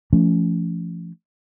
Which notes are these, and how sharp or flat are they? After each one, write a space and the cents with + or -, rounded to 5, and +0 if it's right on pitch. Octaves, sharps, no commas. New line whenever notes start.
F3 -35 A3 +0 C#4 +20